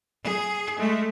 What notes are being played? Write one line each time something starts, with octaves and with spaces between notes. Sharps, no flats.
G#4
G#3 A3